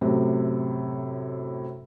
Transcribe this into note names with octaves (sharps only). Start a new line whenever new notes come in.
F#2 A2 C3